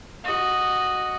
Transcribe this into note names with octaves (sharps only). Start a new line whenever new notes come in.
F#4 D#5